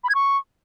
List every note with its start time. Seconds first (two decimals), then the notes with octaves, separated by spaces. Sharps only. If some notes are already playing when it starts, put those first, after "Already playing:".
0.04 B5
0.09 G#6
0.15 C#6